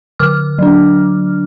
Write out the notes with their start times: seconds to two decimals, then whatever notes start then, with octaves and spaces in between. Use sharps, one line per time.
0.19 D3 D6 F6
0.59 F#3 D4